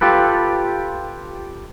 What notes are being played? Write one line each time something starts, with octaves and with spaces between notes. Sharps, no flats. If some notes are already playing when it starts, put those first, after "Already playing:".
F4 G4 A4 B4